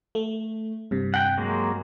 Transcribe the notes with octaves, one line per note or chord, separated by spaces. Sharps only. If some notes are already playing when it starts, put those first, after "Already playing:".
A3
G2 C3
F#5 G5
F#3 G#3 A#3